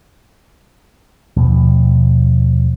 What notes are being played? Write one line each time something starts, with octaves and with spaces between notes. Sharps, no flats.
D#2 B2 F3 A3